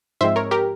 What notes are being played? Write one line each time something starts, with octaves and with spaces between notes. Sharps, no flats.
G#2 F3 G#3 C4 C5 E5
A#4 C#5
G4 A#4